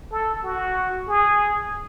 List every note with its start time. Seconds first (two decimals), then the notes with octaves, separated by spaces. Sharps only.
0.11 A4
0.44 F#4
1.08 G#4